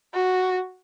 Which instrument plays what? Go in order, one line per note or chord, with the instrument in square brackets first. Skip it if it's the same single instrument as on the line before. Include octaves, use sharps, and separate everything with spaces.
[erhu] F#4